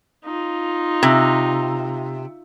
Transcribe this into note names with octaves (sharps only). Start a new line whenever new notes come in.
D#4 F4
C3